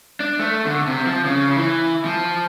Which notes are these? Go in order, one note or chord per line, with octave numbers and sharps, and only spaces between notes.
D4
A3
D3
C3
F3
C#3
E3
F3